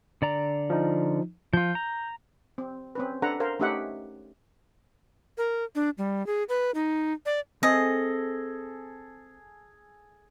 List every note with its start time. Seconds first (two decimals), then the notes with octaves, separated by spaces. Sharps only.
0.22 D3 D5 A#5
0.70 F3 D#4
1.53 F3 F4 G6
1.75 A#5
2.58 C4
2.95 C4 C#4 B4
3.22 D4 A4 B4 F#5 A#5
3.40 A#4 C5 F5
3.59 A3 C#4 D#4 G4 E5 F#5
5.38 A#4
5.75 D4
5.98 G3
6.27 G#4
6.49 B4
6.75 D#4
7.26 D5
7.63 C4 G#4 A4 D#5